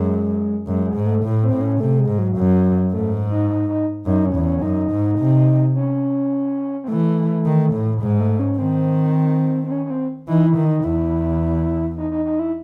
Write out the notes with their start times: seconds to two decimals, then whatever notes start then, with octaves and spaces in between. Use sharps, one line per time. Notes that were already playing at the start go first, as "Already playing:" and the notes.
Already playing: F#2 G#3
0.67 F#2 G#3
0.85 G#3
0.95 G#2
1.05 A3
1.24 A2
1.42 C4
1.52 A2
1.61 C#4
1.80 C3 A3
1.99 G#3
2.08 G#2
2.18 F#3
2.37 F#2
2.93 G#2 A3
3.30 D#4
3.49 D#4
3.69 D#4
4.06 F#2 D#4
4.25 C#4
4.35 E2
4.44 C#4
4.62 F#2 D#4
4.91 G#2
5.19 C3
5.75 C#4
6.84 C4
6.88 E3 A3
7.46 D#3
7.74 A2
8.01 G#2 G#3
8.20 A3
8.40 C#4
8.58 D#3 C4
9.64 C4
9.71 C#4
9.86 C#4
9.90 C4
10.28 E3 D#4
10.47 E4
10.57 D#3
10.65 D#4
10.84 E2 E4
11.97 D#4
12.11 D#4
12.25 D#4
12.39 E4